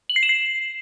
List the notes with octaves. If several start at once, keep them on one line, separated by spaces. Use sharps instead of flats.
F#7
C7
E7
C7